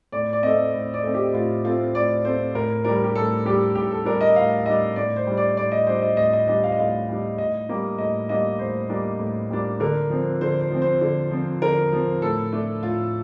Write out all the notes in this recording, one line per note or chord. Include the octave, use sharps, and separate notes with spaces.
A2 D5
D5
A3 C4 D#5
A2
D5
A3 C4
G4
A2 F4
A3 C4 F4
A2 D5
A3 C4 C5
A2 A#4
G3 D4 A#4
G4
A2 A4
G3 D4 G4
A2 G4
A4
G3 D4 A#4
D#5
A2 F5
G3 D4 D#5
A2 D5
C5
G3 D4
D5
A2 D5
D#5
G3 D4 C5
D#5
A2 D#5
D#5
G3 D4 D#5
F5
D#5
A2 F5
G3 D4
A2 D#5
G3 A#3 D4
A2 D#5
G3 A#3 D4 D#5
A2 C5
G3 A#3 D4
A2
G3 A#3 D4
D3 A#4
F3 C4
D3 C5
C5
F3 C4
C5
D3
F3 C4
D3 A#4
F3 C4
A2 A4
A3 D4
A2 F4